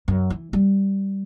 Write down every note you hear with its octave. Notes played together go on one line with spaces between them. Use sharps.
F#2
E3
G3